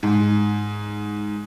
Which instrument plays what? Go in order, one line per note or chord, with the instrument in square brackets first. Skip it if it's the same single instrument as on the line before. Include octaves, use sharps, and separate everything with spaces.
[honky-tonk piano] G#2